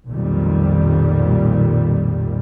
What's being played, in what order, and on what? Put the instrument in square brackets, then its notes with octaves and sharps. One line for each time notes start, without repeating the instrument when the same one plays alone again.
[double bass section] B1 F2 A#2 D#3 G3